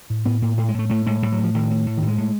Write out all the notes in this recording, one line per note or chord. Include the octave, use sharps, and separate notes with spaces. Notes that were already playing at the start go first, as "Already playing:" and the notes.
A2
A2 B3
A2 A#3
A2 A3
G#3
A2 A3
A2 A3
A2 G#3
A2 G3
F#3
A2
F3
A2 D#3
A2
A2
D#3
A2
G#3
A2